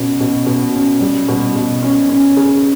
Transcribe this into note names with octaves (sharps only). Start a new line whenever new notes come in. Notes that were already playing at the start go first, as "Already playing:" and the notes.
Already playing: B2 C#4
B2
B2
C#4
G3
B2
B2
C#4
C#4
G#4